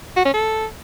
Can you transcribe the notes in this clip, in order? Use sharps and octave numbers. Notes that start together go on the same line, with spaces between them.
F#4
C#4
A4